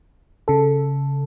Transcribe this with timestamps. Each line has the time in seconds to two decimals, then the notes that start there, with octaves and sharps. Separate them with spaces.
0.48 C#3 A4